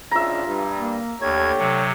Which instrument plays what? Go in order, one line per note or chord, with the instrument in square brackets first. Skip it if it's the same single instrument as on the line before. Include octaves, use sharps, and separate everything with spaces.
[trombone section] G#1 C#3 D4 [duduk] F4 [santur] E5 A#5
[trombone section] G2
[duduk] A#3
[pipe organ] D#2 G#6 [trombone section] D3 A3 G4 [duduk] C#5
[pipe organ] C3 F#3